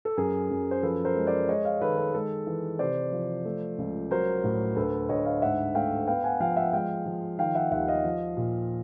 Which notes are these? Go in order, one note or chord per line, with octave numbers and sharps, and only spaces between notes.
A4
F#2 G#4 A#4
F#2
C5
F3 A4 B4
A#4 C5
G#3
C5 D5
G#3 C#5 D#5
D#5 F5
D#3 A4 B4
A4
G#3 A4
E3
C3 C5 D5
F3
A3
C#2
F#3 A#4 C5
A2
D2 A4 B4
D2 C#5 D#5
D#5 F5
G#2 E5 F#5
A3 F5 G5
B3 F5 G5
F#5 G#5
F3 F5 G5
E5 F#5
G#3 F5 G5
F3
D#3 F5 G5
E5 F#5
D#2 E5 F#5
D#5 F5
F3
A#2